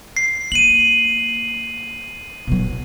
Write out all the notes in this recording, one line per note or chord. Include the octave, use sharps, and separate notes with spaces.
C7
A#3 D#7 F#7
B2 F#3